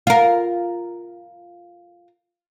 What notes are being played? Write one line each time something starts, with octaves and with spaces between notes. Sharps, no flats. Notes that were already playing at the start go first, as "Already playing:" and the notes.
F4 A#4